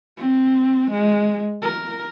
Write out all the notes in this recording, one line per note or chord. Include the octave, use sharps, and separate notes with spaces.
C4
G#3
A#4